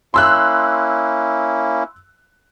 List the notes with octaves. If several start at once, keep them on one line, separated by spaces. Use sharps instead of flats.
A#3 C#4 E4 C6 E6 F#6